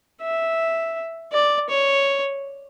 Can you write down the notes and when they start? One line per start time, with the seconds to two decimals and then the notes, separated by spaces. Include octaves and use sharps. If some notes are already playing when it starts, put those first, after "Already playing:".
0.21 E5
1.32 D5
1.69 C#5